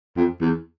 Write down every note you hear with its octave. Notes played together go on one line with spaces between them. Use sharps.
F2
E2